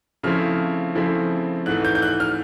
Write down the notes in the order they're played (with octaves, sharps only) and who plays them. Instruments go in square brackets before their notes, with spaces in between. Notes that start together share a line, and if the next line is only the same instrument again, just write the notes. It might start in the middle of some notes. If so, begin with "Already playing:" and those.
[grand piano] C#3 F3 A3 C4 E4 F6
C#3 F3 A3 C4 E4
G#2 E3 A3 F#6
G6
G6
F#6
F6